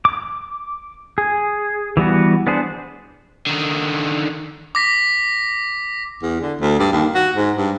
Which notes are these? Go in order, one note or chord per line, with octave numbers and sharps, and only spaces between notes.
D6
G#4
E3 G3 B3 F#4
B3 D4 G#4 C5
D3 D#3
D6 A#6 B6
E2
D3
D2
G2
D#2
F#4
G#2
G2